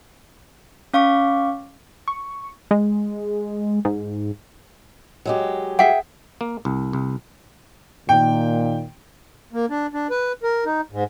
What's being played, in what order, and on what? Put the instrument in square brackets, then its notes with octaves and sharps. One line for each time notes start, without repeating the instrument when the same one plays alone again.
[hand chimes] C#4 F5 C#6 D6
[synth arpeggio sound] C#6
G#3
G#2
[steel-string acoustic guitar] F#3 G#3 G4
[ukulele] G#4 E5 G5 [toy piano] F#5
[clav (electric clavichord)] A#3
C2
C2
[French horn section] A#2 D#3 [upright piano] G5
[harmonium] A#3
D4
D4
B4
A#4
D#4
G#2